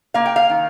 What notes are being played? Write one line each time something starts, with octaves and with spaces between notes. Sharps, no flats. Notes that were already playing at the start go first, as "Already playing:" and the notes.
A#3 F5
G5
F5
D#3